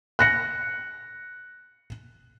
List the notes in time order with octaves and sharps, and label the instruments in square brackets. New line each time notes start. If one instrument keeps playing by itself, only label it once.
[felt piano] F#6 A#6 C#7